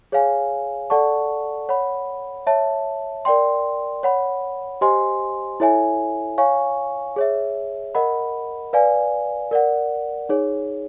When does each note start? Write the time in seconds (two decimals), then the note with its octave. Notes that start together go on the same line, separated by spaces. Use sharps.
0.12 G#4 C#5 F5 G#5
0.90 A4 D5 F#5 A5 C#6
1.69 C#5 F#5 B5
2.47 C#5 E5 A5
3.25 A#4 D5 G5 C6
4.03 C#5 F#5 B5
4.81 G4 C5 D#5 G#5 C6
5.60 E4 A4 C#5 E5 G#5
6.38 C#5 F5 G#5 C#6
7.16 G#4 C#5 E5
7.95 A#4 D#5 F#5 B5
8.73 B4 D5 F5 G#5
9.51 A#4 D5 F#5
10.29 D#4 G#4 C#5